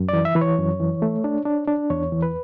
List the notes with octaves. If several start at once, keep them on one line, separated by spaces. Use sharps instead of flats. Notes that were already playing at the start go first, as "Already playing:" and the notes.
Already playing: F#2
E3 D5
E5
E3 B4
C#5
F#2
E3
A3
D4
D4
D4
E2 C#5
E3
B4